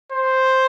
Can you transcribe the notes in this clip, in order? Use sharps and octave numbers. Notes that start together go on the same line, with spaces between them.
C5